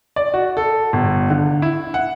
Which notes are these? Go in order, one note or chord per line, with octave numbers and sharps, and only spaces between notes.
D5
F#4
A4
G1
D3
E4
F#5